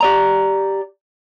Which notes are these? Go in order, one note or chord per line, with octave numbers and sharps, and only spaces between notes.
G4 D5 A#5